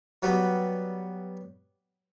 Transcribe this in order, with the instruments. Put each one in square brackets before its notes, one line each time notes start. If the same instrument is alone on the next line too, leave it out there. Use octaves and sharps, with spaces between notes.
[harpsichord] F#3 G3 B3